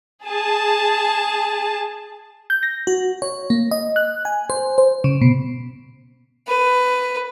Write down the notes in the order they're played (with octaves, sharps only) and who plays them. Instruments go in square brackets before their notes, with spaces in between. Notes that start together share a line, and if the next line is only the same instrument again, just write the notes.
[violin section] G#4 A5
[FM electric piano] G6
A#6
F#4
C#5
A#3
D#5
F#6
G#5
C5
C5
C#3
B2
[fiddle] B4